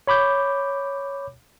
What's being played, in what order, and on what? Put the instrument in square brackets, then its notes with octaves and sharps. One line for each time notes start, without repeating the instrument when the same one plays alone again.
[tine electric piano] C#5 B5 D6 G6